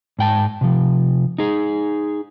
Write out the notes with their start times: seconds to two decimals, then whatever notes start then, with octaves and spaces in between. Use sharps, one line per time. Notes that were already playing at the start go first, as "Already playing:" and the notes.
0.19 G#2 G5 A5
0.61 C3 F3
1.38 D#4 G#4